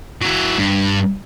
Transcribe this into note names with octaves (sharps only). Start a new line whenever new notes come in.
F#3 E4
G2